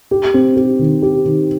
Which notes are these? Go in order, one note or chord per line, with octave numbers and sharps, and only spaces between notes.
G4
C4
G4
D#3
G4
D#3